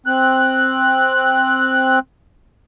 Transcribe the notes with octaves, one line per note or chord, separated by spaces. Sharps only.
C4 F#6